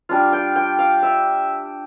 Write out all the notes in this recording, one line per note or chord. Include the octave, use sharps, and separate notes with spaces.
G3 D4 F4
G5
G5
F5
E5